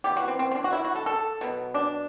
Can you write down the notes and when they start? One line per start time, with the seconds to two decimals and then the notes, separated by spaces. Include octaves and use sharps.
0.04 E3 B3 G4
0.17 F#4
0.28 C4
0.39 C4
0.52 C4
0.55 D4
0.64 F#4
0.73 E4
0.85 F#4
0.95 A4
1.06 A4
1.41 B2 F#3 B3
1.74 D4